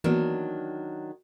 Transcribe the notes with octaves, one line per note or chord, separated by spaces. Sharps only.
D#3 E3 F#3 A#3 B3 D4